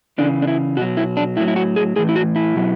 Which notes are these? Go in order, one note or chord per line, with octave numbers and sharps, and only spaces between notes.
C#3 E3 D4
D4
E4
B2 F#3 F#4
E4
D4
A2 F#3 E4
E4
F#4
G#4
A2 E3 G#4
E4
F#4
E4
B2 F#3